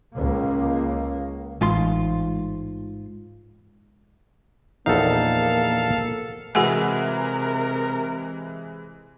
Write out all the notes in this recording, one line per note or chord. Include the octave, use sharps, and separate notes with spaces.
C#2 A#3
A1 G#2 F4 C6
A#1 E2 A#3 D#4 A4 F5
C3 E3 G#3 F#4 A#4 F#5 G#5